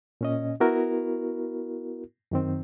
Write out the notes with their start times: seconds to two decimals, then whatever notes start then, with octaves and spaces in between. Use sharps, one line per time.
0.21 A#2 C#4 D#5
0.60 B3 E4 F#4 A#4
2.31 F#2 D#3 C4